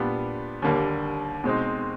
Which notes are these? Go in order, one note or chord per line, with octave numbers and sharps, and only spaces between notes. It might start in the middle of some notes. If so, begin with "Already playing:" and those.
Already playing: A#2 G3 B3 D4 G4
D#2 D3 G3 A#3
B2 G#3 C4 D#4